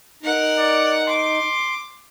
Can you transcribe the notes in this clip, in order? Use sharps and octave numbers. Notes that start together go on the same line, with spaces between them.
D#4 A#4 F#5
D5
C6 D6